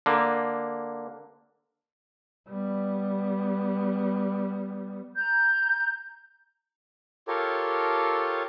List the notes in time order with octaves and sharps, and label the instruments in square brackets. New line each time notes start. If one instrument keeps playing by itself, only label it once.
[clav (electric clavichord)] D3 A#3
[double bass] G3 B3
[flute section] A#5 G6
[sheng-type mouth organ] F4 G4 A4 A#4 C#5